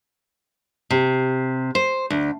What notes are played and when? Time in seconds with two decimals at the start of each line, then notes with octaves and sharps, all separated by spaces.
0.90 C3
1.75 C5
2.10 D2